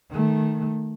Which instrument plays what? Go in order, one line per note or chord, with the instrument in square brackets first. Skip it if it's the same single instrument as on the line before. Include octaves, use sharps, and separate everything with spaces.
[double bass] D#3 A3